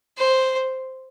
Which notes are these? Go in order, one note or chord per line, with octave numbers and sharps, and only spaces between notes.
C5